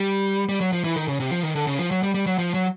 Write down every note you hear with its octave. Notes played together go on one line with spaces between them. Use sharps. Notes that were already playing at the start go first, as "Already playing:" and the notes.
Already playing: G3
G3
F#3
F3
E3
D#3
C#3
C3
F3
D#3
D3
C#3
F3
F#3
G3
G3
F#3
F3
F#3